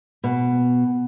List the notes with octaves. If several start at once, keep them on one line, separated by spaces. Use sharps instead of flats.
B2